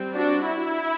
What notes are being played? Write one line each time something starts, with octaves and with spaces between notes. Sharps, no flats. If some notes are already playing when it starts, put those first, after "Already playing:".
Already playing: G3 C4
D4 F#4
E4